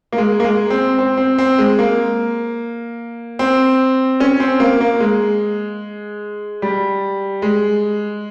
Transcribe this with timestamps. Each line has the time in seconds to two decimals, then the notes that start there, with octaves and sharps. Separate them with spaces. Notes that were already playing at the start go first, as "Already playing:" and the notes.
0.12 A#3
0.18 G#3
0.40 A#3
0.44 G#3
0.70 C4
0.98 C4
1.17 C4
1.38 C4
1.58 G#3
1.79 A#3
3.39 C4
4.20 C#4
4.40 C4
4.60 A#3
4.81 A#3
5.00 G#3
6.62 G3
7.42 G#3